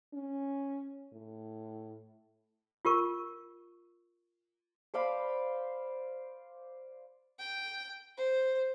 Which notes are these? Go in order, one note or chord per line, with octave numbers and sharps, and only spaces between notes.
C#4
A2
F4 G4 A#4 C#6
C5 D5 F5 B5
G5
C5